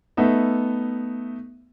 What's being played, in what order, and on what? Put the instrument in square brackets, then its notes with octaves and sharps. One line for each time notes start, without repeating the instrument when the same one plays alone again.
[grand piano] A3 B3 D#4 E5